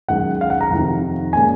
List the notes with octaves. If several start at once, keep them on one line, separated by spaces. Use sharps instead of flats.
F#2 D#3 G#3 F#5
F5
F#5
A#5
F2 C3 D#3
A#2 G#3 C#4 G#5